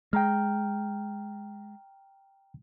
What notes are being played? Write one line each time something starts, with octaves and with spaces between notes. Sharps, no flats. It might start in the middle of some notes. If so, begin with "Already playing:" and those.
G#3 G5 A#5 F6